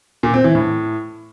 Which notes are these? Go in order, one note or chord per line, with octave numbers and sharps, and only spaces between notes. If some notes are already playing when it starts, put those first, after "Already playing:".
A#2
C4
E3
A2